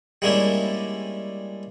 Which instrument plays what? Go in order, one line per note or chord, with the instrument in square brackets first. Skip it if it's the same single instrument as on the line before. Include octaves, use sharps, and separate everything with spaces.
[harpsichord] G3 G#3 A#3 C#4 D4 E4